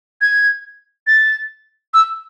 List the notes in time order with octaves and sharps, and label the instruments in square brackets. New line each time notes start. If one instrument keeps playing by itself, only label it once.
[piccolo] G#6
A6
E6